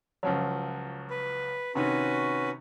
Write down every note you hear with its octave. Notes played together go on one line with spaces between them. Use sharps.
C#2 F3 F#3
B4
C3 D#3 C#4 F#4 B4